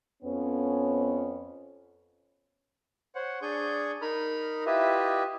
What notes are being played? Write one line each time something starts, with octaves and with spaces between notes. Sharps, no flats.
F2 B3 C#4
C5 C#5 F#5
D4 G#4 G#5 C#6 G6
D#4 A#4 B5 F6
E4 F4 G4 B4 D#5 E5